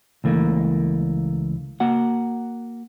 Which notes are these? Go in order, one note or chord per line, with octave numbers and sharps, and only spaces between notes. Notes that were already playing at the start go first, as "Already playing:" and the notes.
C#2 E3 A3 A#3
A#3 F#4 F#5